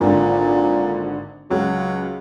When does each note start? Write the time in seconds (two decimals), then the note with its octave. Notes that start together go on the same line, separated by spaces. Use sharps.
0.01 G#1 A#2 D3
1.51 C#2 F#3